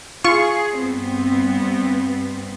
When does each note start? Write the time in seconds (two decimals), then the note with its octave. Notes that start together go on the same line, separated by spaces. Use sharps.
0.24 F4 G#4 C#6
0.79 G2 B3 C4